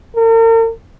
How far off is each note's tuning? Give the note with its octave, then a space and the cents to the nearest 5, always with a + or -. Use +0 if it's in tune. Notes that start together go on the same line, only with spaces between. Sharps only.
A#4 -45